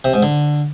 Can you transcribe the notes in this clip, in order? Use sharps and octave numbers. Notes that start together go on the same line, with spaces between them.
C3
G#2
D3